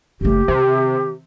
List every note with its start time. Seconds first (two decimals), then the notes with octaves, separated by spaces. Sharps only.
0.21 F#1 A3 G4
0.48 C3 D#3